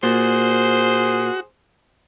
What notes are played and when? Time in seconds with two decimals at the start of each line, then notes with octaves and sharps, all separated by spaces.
0.03 A#2 F#4 G#4 C5